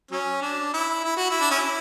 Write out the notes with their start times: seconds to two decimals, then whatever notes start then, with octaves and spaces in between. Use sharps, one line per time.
0.11 F#3 C#4
0.42 D4
0.74 E4
1.04 E4
1.17 F#4
1.31 E4
1.41 D4
1.51 C#4 E4